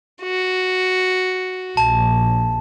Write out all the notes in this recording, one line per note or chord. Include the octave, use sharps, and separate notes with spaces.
F#4
A#1 A5